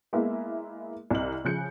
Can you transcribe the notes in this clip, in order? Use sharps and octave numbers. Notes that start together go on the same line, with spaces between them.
G#3 A#3 B3 E4 E5
C2 C3 D#5 F#7
C#3 F3 F#6 G6 C#7